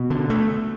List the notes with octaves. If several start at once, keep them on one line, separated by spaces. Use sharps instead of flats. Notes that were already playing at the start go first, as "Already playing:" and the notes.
Already playing: B2
D3
A3